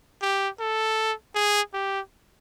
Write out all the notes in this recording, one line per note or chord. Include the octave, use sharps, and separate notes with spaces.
G4
A4
G#4
G4